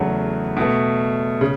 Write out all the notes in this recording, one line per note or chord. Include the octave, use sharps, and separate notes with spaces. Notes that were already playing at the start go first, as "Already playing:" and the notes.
Already playing: E2 C#3 F#3 A3
B2 A3
C#3